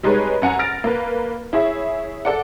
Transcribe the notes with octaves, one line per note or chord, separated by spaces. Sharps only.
G3 G#3 D#4 G#4 B4 C#5
F#2 F#5 G#5 A#5
F6 A6 A#6 D7
A#3 B4
E4 G#4 C#5 E5
A4 D5 F#5